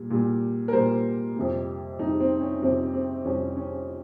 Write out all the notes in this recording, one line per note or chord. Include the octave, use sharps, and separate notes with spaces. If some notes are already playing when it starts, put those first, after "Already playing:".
Already playing: A#2 G3
A#2 G3
A#4
A#2 G3 C5
F2 C3 G3
F2 C3 G3 D#4
C4
C#4
F2 C3 G3 C4
C4
F2 C3 G3 C#4
C#4